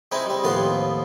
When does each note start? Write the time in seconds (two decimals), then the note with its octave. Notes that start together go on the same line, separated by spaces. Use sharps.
0.12 G#3 C4 D#4 E4
0.26 G3 C4
0.43 D#2 A2 F3 B3 C6